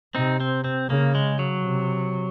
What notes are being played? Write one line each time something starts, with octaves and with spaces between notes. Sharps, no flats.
C3 C4 D#4
C4
C4
C#3 A#3
G#3
F#3
C3